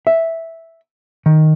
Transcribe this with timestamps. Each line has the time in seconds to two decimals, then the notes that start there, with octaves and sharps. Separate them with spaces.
0.07 E5
1.26 D#3